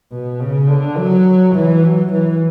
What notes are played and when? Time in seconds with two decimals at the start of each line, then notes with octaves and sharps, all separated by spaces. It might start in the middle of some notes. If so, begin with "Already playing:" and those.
0.12 B2
0.40 C#3
0.69 D3
0.97 F#3
1.55 E3
1.83 F#3
2.12 E3